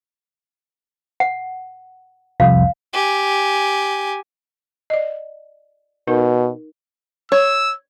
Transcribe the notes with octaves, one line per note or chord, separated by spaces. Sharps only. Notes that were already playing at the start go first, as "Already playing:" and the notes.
F#5
C2 F2 F5
G4 G#5
D5 D#5
B2 D#4 A#4
C#5 E6